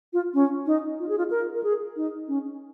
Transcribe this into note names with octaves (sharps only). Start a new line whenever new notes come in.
F4
C#4
D#4
F4
G#4
F4
A#4
A#4
G#4
D#4
C#4